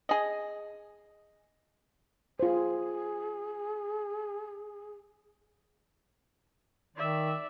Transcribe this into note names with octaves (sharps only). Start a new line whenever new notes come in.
G#4 D#5
F4 G#4 C5
D#3 D5 E5